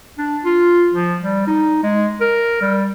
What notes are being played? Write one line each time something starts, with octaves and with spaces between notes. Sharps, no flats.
D4
F4
F3
G3
D#4
G#3
A#4
G3